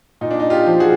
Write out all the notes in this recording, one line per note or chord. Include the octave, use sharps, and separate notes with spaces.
A#2 D#4
D4
D#4
F4 G4
F3
F#4 G#4